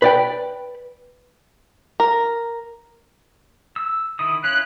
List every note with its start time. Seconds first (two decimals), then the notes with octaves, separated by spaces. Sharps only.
0.02 B4 D5 G5
2.00 A#4
3.76 E6
4.19 D#3 E4 D#6
4.44 C#4 E4 F4 F#6